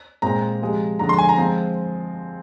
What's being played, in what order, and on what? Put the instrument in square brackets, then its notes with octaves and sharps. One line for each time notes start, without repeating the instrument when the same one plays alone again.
[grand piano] A#2 G#3 C4 A#5
C3 F3 G#3
F2 D3 G#3 A#5
C6
G#5
A#5
F3 G#3 C4